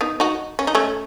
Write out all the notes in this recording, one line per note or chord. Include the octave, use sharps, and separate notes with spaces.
B3 D#4
D#4 F#4
C#4
D#4
A3 C#4